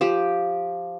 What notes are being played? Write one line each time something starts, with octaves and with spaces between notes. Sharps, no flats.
F3 G4